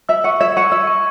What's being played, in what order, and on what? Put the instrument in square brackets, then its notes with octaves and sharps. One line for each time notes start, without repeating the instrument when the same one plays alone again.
[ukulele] E5 [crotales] E6
[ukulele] F#5 [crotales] C#6
[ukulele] E5 [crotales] G#6
[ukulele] F#5 [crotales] C#6
[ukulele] E5 [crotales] E6
[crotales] C#6